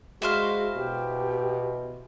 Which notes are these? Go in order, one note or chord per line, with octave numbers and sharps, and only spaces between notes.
G#3 E4 F#4 C5 F5
B2 G4